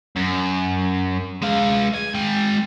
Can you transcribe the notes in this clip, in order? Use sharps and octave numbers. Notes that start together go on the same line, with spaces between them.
F#2
G#3 F5
G#5
G#3 G5